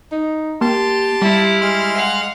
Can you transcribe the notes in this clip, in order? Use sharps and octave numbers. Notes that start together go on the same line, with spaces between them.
D#4
A#3 G4 A5 C6
G3 E4 F5
G#3 C6 F6
F5 F#5